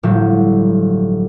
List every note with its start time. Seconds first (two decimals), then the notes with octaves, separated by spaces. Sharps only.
0.03 G1 A2 F3 F#3